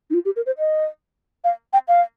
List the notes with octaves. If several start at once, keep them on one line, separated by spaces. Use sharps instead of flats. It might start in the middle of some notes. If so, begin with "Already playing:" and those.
D#4
F4
G4
A#4
C5
D#5
F5
G5
F5